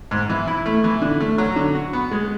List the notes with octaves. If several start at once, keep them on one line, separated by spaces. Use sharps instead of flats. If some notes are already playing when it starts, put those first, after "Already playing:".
G#2
E3
E4
A3
E3
D3
A3
F#3
D3
F#4
B3
G#3